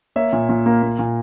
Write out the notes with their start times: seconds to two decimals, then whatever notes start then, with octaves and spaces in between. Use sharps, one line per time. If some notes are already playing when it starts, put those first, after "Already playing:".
0.16 A#3 C#5 E5
0.33 A#2
0.49 A#2
0.66 A#3
0.83 A#3
0.99 A#2